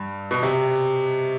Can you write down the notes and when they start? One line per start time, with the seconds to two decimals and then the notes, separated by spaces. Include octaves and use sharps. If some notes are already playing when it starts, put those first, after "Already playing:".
Already playing: G2
0.31 B2
0.43 C3